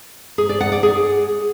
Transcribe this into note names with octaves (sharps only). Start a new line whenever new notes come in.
G#4
D5
F#5
D5
G#4